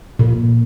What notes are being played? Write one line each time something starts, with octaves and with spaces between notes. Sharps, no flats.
A#2